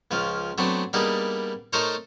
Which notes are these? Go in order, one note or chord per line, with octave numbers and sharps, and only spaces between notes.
C#2 C#3 F3 F4
F#3 A3 B3 C4 D4
G3 A#3 B3 D4 D#4 G#4
A3 D#4 A4 A#4 C5 C#5